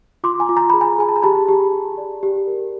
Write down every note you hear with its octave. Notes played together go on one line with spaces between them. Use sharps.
F4 C6 D6
G#5 A#5
F4
A#5
G#4 B5
G#5 A#5
G#4 G#5
A5
A#5
G4 A5 B5
G4
G4
D5
G4
A#4